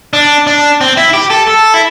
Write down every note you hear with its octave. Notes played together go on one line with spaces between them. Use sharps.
D4
D4
C4
E4
G4
A4
A4
E4